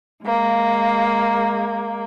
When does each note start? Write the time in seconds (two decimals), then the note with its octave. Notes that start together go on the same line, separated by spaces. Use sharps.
0.24 G#3 A#3